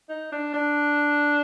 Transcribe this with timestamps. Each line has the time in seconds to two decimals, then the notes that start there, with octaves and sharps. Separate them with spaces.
0.09 D#4
0.32 D4
0.54 D4